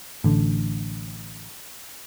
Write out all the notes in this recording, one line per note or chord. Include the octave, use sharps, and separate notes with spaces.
A1 D3